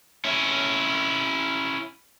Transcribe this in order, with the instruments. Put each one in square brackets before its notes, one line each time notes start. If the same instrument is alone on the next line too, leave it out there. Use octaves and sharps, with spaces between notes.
[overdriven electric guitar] C#4 E4